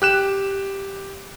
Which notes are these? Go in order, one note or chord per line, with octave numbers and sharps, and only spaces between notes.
G4 F#6 E7